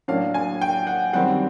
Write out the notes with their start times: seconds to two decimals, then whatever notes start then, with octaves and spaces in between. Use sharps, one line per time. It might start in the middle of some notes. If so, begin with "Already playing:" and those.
0.08 A2 F#3 A#3 D4 F5
0.34 G#5
0.61 G5
0.87 F#5
1.13 F#2 D#3 G3 C4 F#5